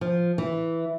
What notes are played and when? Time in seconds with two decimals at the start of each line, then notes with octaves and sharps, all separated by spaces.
0.01 F3
0.38 E3